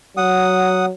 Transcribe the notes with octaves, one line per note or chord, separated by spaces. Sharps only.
F#3 F#5 D#6